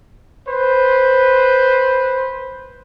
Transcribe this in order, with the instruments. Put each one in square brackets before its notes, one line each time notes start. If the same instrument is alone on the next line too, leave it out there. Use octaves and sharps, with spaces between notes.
[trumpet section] B4 C5